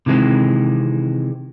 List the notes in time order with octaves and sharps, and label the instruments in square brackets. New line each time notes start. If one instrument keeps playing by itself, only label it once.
[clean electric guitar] C3 D#3 E3 G#3 C4